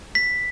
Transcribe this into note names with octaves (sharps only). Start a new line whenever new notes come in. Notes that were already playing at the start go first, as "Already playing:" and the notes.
B6